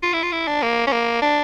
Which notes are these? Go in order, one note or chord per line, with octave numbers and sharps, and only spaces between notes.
F4
E4
F4
E4
D4
A#3
C#4
A#3
D4